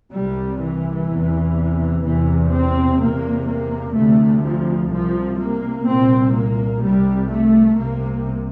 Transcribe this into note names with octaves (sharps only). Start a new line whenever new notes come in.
C2 C3 G3
E3
E2 C3
E2 C3 E3
C4
E2 C3 A#3
A#3
D2 C3 A3
F3
C2 C3 F3
A#3
C2 A#2 C4
A#3
C2 C3 G3
A3
C2 C3 A#3